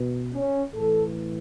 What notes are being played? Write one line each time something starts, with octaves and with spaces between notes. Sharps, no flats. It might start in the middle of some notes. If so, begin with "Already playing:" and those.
Already playing: B2
C#4
A2 E3 A4